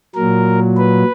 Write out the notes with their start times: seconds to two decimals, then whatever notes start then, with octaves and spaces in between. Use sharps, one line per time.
0.15 A#2 F#3 A#4
0.77 B4